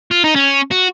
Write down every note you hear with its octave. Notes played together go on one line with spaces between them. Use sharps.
F4
D#4
C#4
F#4